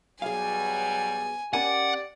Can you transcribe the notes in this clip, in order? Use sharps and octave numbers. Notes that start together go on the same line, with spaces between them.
B2 F#3 G3 G#4 F5 G#5
C#4 G4 A#4 D5 F#5 G#5